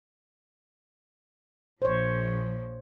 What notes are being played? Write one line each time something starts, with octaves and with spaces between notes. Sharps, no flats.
A#1 F3 C5 C#5